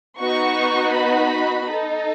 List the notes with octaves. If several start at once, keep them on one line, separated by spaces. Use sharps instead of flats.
B3 D#4 F#4 C#6
B5
D#4 A4